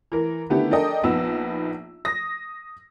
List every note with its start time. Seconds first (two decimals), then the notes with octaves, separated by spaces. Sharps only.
0.12 E3 A#4
0.50 D3 D#3 A3 B3 E4 G4
0.71 D4 A4 A#4 D#5 G5
1.03 A#1 B3 D#4 E6
2.05 D#6 A#6